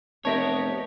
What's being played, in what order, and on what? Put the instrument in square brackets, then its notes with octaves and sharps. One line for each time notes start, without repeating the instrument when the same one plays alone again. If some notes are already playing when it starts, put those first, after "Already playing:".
[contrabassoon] F1 [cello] B3 D#5 [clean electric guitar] G4 A#4 C#5 [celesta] E5 A5